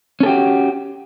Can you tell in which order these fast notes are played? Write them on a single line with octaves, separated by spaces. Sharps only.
C#4 A4 G4 F#4